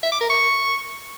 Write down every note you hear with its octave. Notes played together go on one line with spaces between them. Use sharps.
E5
D6
A#4
C#6